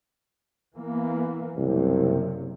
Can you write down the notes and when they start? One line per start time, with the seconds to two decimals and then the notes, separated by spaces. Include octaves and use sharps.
0.75 E3 A#3 B3
1.57 F#1 C2 C3